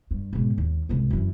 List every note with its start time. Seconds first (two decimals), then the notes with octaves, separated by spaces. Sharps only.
0.11 G2
0.33 G#2 B2
0.58 D#2
0.89 C2 G#2
1.10 F#2 E3